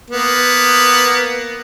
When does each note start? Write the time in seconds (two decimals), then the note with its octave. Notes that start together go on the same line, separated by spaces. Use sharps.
0.10 A#3 B3